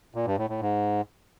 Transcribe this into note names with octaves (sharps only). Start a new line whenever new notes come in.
A#2
G2
A2
A2
G#2